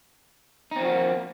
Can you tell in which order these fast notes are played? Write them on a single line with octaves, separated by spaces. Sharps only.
D#4 C4 F3 F#4 A#3